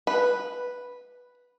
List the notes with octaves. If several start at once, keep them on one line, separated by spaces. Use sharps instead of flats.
B4